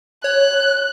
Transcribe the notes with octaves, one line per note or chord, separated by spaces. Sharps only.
C#5 F#6